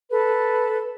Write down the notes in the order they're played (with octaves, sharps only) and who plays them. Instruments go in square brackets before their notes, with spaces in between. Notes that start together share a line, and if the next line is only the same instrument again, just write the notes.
[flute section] A4 B4